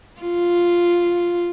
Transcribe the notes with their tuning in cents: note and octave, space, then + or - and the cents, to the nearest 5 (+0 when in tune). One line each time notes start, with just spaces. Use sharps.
F4 +0